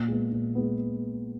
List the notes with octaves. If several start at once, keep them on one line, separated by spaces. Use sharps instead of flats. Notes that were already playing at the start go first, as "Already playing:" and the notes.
Already playing: A#2
G#3 B3
A#2
G#3 B3